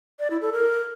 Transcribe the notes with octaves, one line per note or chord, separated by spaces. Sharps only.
D5
E4
A4
A#4